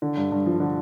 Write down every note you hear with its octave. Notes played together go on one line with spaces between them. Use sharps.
D3
G2
G2
F3
D3